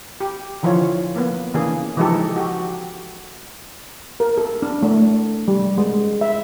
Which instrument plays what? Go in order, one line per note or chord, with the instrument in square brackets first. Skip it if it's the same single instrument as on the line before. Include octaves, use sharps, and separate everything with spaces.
[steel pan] G4
D3 E3 F3 E4 F4 C#5
A#3 B3
C#3 E3 A#3 D4 G#4
E3 F3 G#3 D#4 G4 A4
F#4 G4
A#4
A4
D4
A3
G3
G#3
E5